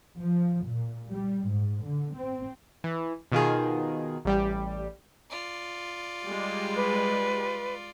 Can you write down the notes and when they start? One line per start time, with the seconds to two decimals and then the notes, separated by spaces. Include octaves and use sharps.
0.20 F3
0.66 A#2
1.10 G3
1.47 G#2
1.85 D3
2.16 C4
2.84 E3
3.32 B2 D#3 F4 G#4
4.25 A1 G3 G4
5.30 F4 D5
6.25 G3 G#3
6.76 B4